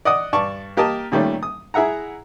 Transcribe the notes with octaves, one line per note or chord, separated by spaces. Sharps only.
D5 D#5 F#5 D#6
G2 D5 A5 C#6
A#3 G4 A#4 D#5 A5
A#2 D#3 G3 A3 C#4
D#6
E4 G#4 E5 F#5 A#5